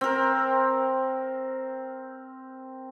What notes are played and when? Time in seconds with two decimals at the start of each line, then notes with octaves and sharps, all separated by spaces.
0.01 C4 A#4